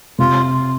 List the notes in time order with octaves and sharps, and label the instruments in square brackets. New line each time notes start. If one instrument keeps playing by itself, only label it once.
[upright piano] C3 [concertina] F4